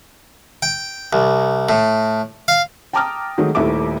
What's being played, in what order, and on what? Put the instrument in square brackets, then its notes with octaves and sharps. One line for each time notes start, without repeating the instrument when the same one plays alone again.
[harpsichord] G5
C2
A2
F5
[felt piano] G5 A5 A#5 D6 D#6 F6
D#3 F#3 G#3 A3
D#1 D#2 A3 E4 E5 D6